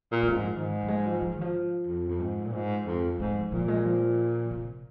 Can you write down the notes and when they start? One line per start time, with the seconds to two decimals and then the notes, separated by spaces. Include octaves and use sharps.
0.12 A#2
0.23 G#3
0.29 F2
0.33 G#2
0.39 F3
0.55 G#2 D#3
0.83 F3
0.88 G#3
1.06 F3
1.21 F3
1.32 D#3
1.41 F3
1.87 F2
2.09 F2
2.21 G#2
2.46 A#2
2.53 G#2
2.86 F2
3.19 G#2 G#3
3.36 F3
3.52 A#2 F3
3.68 G#3
3.85 F3
4.51 C3